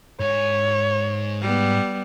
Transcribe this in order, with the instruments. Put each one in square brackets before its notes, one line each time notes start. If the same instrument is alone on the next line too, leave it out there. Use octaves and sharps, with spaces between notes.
[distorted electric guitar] G#2 G#5 [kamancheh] C#5
[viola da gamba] G3 B3